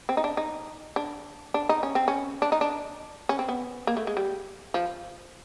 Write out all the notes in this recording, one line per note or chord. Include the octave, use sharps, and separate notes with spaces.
C4
D#4
D4
D#4
D4
D4
D#4
C#4
C4
C#4
D4
D#4
D4
C#4
C4
B3
A#3
A3
G#3
G3
F3